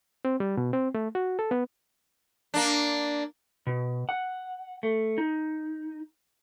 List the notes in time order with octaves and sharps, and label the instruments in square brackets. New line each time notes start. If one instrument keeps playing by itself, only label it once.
[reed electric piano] C4
G3
B2
C4
A3
F#4
A4
B3
[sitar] A#3 D4
[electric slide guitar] B2
F#5
A3
D#4